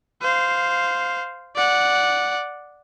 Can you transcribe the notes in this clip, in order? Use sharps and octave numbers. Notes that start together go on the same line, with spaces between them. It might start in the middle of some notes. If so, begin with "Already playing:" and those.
C5 F5
D5 F#5